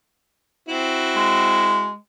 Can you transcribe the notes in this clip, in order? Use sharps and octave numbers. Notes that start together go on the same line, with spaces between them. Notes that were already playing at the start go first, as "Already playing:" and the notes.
C4 E4 F#4
G#3